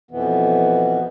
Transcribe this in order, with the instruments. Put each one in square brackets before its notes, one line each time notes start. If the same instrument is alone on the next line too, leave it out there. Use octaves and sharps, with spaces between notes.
[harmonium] F2 B2 E3 B3